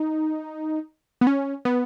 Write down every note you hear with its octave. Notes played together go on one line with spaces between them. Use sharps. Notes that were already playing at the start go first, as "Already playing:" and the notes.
Already playing: D#4
B3
C#4
B3